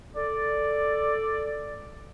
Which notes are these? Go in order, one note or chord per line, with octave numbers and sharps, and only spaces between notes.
A4 D5